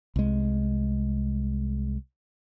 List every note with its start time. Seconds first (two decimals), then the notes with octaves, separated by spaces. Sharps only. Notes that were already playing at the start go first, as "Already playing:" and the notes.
0.16 C2 G#3